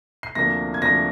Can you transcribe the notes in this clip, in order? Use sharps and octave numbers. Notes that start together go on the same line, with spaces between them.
C7
D2 C3 F3 A#3 D4 A#6
G#6
D2 C3 F3 A#3 D4 A#6